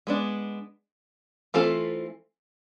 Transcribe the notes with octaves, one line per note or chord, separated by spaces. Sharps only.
G#3 B3 D4
E3 A3 C4 F4 A4